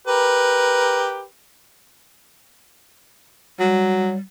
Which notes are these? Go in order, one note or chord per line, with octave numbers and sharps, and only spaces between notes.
G4 A#4 B4
F#3 G3